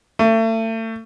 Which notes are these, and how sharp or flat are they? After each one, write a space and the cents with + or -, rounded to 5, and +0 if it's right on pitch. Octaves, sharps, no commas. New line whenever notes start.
A3 +35